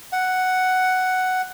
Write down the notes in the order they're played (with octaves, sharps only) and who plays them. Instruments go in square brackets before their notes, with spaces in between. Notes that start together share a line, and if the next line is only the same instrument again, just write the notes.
[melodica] F#5